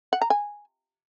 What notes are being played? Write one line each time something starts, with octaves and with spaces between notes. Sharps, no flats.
F#5
A#5
G#5